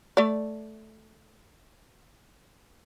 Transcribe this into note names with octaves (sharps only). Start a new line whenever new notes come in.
A3 D5